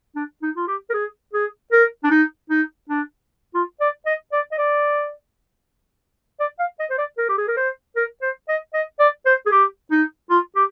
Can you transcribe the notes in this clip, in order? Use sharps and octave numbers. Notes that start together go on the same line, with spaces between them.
D4
D#4
F4
G4
A#4
G#4
G#4
A#4
D4
D#4
D#4
D4
F4
D5
D#5
D5
D#5
D5
D5
F5
D#5
C5
D5
A#4
G4
G#4
A#4
C5
A#4
C5
D#5
D#5
D5
C5
G#4
G4
D#4
F4
G4